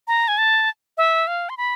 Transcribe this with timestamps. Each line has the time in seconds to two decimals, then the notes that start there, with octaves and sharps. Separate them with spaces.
0.08 A#5
0.28 G#5
0.38 A5
0.98 E5
1.27 F5
1.49 C6
1.57 B5